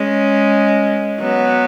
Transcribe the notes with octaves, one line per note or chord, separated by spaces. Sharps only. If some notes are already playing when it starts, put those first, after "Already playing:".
Already playing: G#3 C#4
F#3 B3